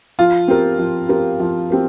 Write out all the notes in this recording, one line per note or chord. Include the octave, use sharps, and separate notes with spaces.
F3 F4
C4 G4 A#4
F3
C4 G4 A#4
F3
C4 G4 A#4